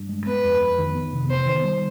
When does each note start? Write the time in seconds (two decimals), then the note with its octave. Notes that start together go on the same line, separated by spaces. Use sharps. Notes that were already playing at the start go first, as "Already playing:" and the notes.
Already playing: G2
0.09 G#3
0.26 B3 B4
0.44 F2
0.60 F2
0.78 D#3
0.95 B3
1.13 C3
1.30 B3 C5
1.46 D#3
1.64 G3